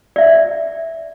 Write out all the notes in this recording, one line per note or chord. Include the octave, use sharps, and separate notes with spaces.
D5 E5